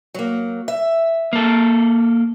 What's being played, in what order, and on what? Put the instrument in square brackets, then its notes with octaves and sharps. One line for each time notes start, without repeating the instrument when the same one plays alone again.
[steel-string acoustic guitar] F#3 A#3
E5
[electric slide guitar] A#3 A4